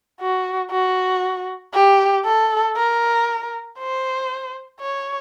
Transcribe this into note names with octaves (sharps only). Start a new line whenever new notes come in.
F#4
F#4
G4
A4
A#4
C5
C#5